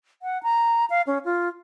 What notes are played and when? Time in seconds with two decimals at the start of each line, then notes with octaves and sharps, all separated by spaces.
0.22 F#5
0.43 A#5
0.90 F5
1.07 C#4
1.25 F4